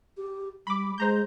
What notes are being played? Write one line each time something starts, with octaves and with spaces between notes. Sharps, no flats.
G4
G3 B5 D6
G#3 C5 A#5 G6